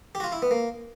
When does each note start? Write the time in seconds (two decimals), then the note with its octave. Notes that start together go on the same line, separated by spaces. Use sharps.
0.15 G4
0.20 F#4
0.23 F4
0.32 E4
0.42 B3
0.51 A#3